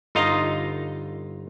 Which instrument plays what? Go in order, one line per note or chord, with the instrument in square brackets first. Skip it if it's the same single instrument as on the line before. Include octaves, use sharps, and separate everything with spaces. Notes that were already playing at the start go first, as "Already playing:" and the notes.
[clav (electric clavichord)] G1 D3 D#4 F4 D#5 A#5